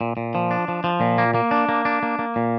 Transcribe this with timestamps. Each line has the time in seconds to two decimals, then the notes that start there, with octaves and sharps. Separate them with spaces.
0.01 A#2
0.17 A#2
0.35 F3
0.51 D4
0.68 F3
0.84 F3
1.01 A#2
1.18 A#3
1.34 A#3
1.51 D4
1.69 A#3
1.85 D4
2.03 A#3
2.19 A#3
2.36 A#2